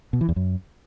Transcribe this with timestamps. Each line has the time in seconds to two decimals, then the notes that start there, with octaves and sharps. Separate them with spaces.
0.13 B2
0.21 E3
0.29 E2
0.36 F#2